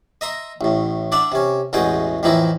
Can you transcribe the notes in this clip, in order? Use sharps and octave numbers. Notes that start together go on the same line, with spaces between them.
D#5 E5 A#5 C6
A1 A2
D4 D5 E5 F#5
C3 C#4
A1 E2 B2 G#3 G#4 G5
F2 A2 E3 F3 D#4 E4